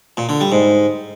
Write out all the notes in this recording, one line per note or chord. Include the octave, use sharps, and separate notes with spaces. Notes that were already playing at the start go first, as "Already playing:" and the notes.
A#2
D3
G3
G#2